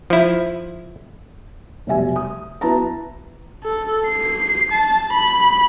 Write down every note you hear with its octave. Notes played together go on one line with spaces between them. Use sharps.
F3 E4
F1 B2 G3 E5 G#5
D#6
B3 E4 F#4 B4 A5 A#5
A4
C7
A5
B5